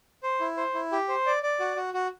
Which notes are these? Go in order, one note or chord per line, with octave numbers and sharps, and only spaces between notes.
C5
E4
C5
E4
G4
C5
D5
D5
F#4
F#4
F#4